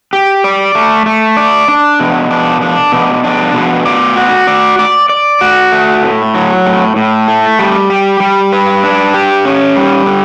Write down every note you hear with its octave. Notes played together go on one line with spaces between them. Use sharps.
G4
D5
A3
A3
D5
D4
B2
D4
D4
B2
D4
B2
D5
F#4
D5
D5
D5
F#4
A3
A2
F#3
A2
A2
A3
G3
G4
G3
B4
D4
G4
C#4
G3
D3